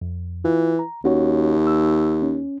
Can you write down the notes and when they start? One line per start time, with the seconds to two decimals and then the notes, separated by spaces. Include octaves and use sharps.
0.02 F2
0.44 E3 F4
0.79 A#5
1.04 D#2 C#4 F#4 C#5
1.67 E6
2.22 C#4